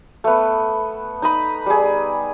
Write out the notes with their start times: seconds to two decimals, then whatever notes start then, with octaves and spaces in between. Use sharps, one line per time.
0.24 A3 B3
1.22 D#4 D#5 B5
1.66 G3 G#4